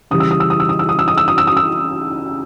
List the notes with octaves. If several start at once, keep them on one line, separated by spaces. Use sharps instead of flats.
C#3 E3 G3 D#6
E6
D#6
E6
D#6
E6
D#6
E6
D#6
E6
D#6
E6
D#6
E6
D#6
E6